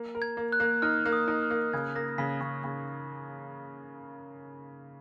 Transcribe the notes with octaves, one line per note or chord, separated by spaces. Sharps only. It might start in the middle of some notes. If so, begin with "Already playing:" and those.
Already playing: A#3
A#4
G#6
A#3
F#6
A#3
D#4 F6
A#3
D#6
D#4
F6
A#3
C#3 G#6
A#3 A#6
C#3 B6
C#3 C#6
C#3